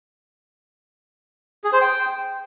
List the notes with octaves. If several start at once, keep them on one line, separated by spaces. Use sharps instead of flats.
G#4
C5
G5